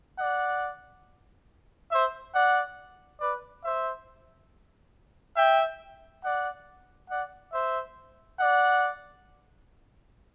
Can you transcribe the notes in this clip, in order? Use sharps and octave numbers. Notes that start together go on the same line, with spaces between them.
D5 F#5
C5 E5
D5 F#5
B4 D5
C5 E5
E5 G5
D5 F#5
D5 F#5
C5 E5
D5 F#5